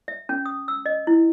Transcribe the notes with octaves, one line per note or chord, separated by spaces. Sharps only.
E5
C#4
D#6
E6
D#5
E4